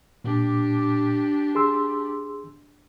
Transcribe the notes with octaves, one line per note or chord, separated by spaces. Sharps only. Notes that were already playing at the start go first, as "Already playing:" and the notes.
A#2 D4 G4
G#4 C6 E6